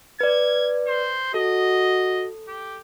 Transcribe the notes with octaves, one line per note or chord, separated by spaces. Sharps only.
B4 D5 G#6
C5
F#4 A4 D#5
G4